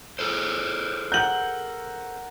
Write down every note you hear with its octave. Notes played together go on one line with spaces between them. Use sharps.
G#4 A4 C5
A#4 F#5 G6 F#7